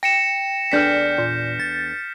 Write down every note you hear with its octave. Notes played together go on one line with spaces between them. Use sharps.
G5 A#6 C#7 E7
E2 D4 A4 F6 G6 B6
A#2
A6